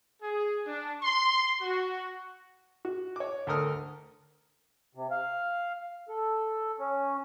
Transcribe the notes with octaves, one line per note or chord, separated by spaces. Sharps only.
G#4
D4
C6
F#4
F#4
C#5 D6
D2 A4 A#4 D#6 F6
C3
F5
A4
C#4